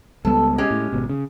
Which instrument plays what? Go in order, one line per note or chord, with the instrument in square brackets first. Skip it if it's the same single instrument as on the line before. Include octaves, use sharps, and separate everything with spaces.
[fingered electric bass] C#2 G3 B3 [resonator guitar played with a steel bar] A4
[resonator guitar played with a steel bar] G#3 C#4 G4
[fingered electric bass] A2
G#1 B2
C#3